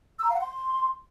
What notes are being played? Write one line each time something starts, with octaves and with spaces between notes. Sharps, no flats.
E6
A#5
F5
F#5
C6